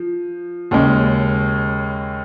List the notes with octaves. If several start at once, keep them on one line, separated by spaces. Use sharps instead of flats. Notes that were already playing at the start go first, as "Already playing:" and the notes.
Already playing: F3
D#2 C#3 G#3